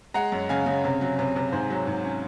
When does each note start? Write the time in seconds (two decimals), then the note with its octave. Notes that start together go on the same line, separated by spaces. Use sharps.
0.14 G#3 F#5 A#5
0.32 F#2
0.49 C#3 F5 G#5
0.66 C#3
0.84 C3
1.01 F#3
1.19 C3
1.36 C3
1.52 G#2 G#4 C5
1.70 F#3
1.87 G#2
2.05 C#4